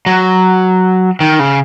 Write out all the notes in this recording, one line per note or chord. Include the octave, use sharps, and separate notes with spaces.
F#3
D#3
C#3